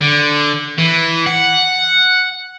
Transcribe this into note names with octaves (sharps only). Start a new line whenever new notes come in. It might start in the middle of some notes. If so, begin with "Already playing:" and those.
D3
E3
F#5